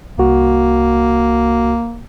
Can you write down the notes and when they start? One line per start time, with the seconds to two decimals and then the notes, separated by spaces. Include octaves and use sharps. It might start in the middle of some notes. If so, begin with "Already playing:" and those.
0.18 C2 A#3 F#4